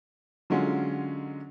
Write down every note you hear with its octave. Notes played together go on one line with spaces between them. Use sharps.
D3 F#3 G#3 C#4 F4